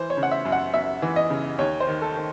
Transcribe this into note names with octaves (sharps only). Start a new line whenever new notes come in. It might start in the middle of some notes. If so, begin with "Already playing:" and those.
Already playing: E3 C5
C#5
C#3
F#5
E5
F#2
F#5
F#2 E5
E3
D#5
C#3
D#2 C#5
C5
D#3
A4
D#3